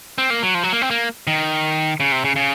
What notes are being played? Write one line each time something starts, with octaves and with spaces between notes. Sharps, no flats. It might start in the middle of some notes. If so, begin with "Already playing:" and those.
C4
A#3
F#3
F3
F#3
A#3
C4
A#3
D#3
C#3
C3
C#3
C#3